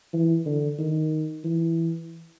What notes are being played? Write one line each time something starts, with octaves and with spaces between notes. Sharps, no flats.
E3
D3
D#3
E3